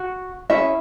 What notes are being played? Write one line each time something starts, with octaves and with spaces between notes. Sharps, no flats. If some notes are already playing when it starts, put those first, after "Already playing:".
Already playing: F#4 F#5
C#4 E4 G#4 E5